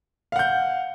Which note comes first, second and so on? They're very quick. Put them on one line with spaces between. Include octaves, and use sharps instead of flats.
F5 F#5 G6